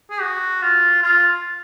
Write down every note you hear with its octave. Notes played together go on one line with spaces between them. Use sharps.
G#4
F#4
F4
F4